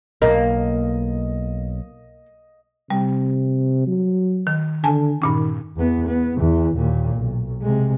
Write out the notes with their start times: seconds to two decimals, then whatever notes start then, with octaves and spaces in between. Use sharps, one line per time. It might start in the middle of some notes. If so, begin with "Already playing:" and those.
0.22 B1 A#3 D#5
2.90 C3 G3
3.87 F#3
4.47 D#3
4.84 D3 G#5 A5
5.22 G2 A#2 D#3 C#4
5.76 E2 B3
6.08 B3
6.38 E2 E3
6.76 D#2 A#2
7.16 B1
7.61 C3 G#3